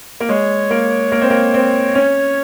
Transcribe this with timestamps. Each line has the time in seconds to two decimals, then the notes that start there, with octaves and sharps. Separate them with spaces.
0.20 A#3
0.29 G#3 C#5
0.70 A#3
1.12 A#3
1.21 C4
1.30 A#3
1.54 C4
1.95 C#4